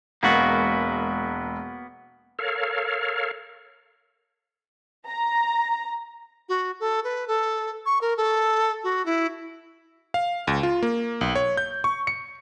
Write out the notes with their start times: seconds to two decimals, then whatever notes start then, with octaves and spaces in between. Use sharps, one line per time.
0.23 E1 G#3 A#3 B3 F#4
2.39 A4 A#4 C#5 F5
5.08 A#5
6.49 F#4
6.80 A4
7.04 B4
7.28 A4
7.86 C#6
8.01 A#4
8.17 A4
8.84 F#4
9.06 E4
10.14 F5
10.47 C#2
10.63 F4
10.83 A#3
11.21 B1
11.35 C#5
11.57 G6
11.84 C#6
12.07 C#7